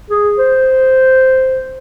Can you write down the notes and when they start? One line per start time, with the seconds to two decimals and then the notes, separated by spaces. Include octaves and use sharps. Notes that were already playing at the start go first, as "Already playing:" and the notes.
0.10 G#4
0.39 C5